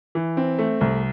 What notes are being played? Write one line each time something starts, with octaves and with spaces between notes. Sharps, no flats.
E3
C4
A3
C2